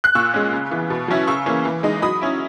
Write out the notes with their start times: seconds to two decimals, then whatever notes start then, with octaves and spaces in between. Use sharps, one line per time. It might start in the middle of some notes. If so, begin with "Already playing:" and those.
0.04 F#6
0.15 A#2 C#6 E6
0.34 G#3 C#4
0.53 C#3
0.71 E3 B3
0.90 B2
1.08 F#3 C#4 E4
1.27 C#3 C#6 E6
1.46 E3 A#3 C#4
1.65 E3
1.83 G#3 D#4
2.02 F#3 B5 D#6
2.21 C#4 E4